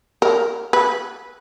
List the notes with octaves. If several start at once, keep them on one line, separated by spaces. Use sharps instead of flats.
A#4
B4